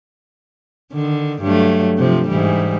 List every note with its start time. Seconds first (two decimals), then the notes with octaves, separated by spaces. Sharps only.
0.93 D3 D#3
1.42 G2 F#3 A3
1.98 C3 F3
2.28 G#2 E3 G3